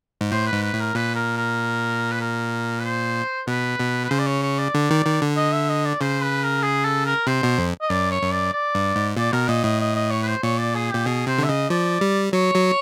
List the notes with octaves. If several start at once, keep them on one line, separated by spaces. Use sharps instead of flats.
G#2
A2 C5
B4
G#2
B4
A2
A#4
A#2 B4
A#4
A#4
B4
A#4
B4
C5
B2 B4
B2
B4
C#3 C5
D5
C#5
C#5
D5
D3
D#3
D#3
D3
D#5
E5
D#5
D5
C#3 C5
B4
A#4
G#4
A4
A#4
C3 C5
B2
F2
D#5
F#2 D5
C#5
F#2
D5
D5
G2
G#2
A#2 D5
B2 A#4
A#2 D#5
A2 D#5
D#5
D#5
C#5
B4
C5
A#2 C#5
D5
G#4
A#2 G4
B2 G#4
C3 C5
D3 E5
C#3 D#5
F3 D5
G3
F#3 C#5
F#3